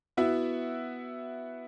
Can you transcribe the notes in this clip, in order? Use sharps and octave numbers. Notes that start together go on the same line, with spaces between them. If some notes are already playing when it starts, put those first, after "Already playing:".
B3 E4 F#4 E5